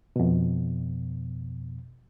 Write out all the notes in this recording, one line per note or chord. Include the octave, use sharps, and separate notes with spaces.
F2 B2